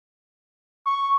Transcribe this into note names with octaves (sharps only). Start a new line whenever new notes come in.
C#6